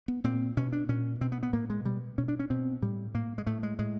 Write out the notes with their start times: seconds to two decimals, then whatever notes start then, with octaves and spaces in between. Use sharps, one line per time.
0.08 B3
0.24 A#2 C4
0.57 B2 C#4
0.72 D4
0.89 A#2 C#4
1.21 B2 C4
1.32 B3
1.43 B3
1.53 A2 A#3
1.70 G#3
1.85 B2 G3
2.18 B2 C#4
2.28 D4
2.39 C#4
2.50 B2 C4
2.82 A2 G3
3.14 A2 A#3
3.38 G#3
3.47 A2 A3
3.63 G#3
3.79 A2 G#3